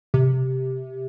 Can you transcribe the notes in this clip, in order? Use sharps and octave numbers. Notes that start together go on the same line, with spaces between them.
C3